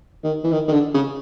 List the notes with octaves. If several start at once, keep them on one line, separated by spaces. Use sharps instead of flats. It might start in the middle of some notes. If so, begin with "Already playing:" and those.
D#3
E3
D#3
D#3
D3
C#3